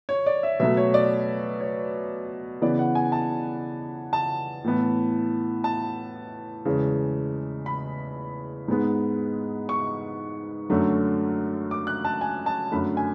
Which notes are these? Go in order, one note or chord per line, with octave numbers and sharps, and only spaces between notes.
C#5
D5
E5
B2 F#3 A3 E5
C#5
D5
C#5
C#3 E3 B3 D5
F#5
G#5
A5
A5
A2 E3 B3
A5
E2 C#3 G#3
B5
G#2 G#3 B3
C#6
F#2 D3 F#3 A3
D6
F#6
A5
G#5
A5
F#2 D3 A3 B5
G#5